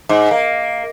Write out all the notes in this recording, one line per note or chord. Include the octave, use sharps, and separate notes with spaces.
G#2
A#3